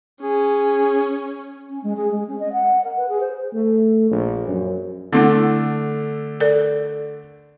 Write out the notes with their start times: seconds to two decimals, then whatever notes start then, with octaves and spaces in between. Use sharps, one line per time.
0.22 C#4 G#4
1.69 C#4
1.83 G#3
1.96 G#4
2.11 G#3
2.27 C#4
2.40 D#5
2.52 F#5
2.84 A#4
2.96 B4
3.08 G#4
3.20 C5
3.53 A3
4.11 A#1
4.48 F#2
5.13 D3 A3 C4 E4 F#5
6.40 A4 A#4 D5